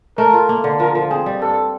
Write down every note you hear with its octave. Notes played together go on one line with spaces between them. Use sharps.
A3 A#4
F4
A#3
D3
F3 A#4
F3
C4 G#4
G3
G2 A4